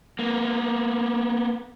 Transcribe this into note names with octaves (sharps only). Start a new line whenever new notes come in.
A#3 B3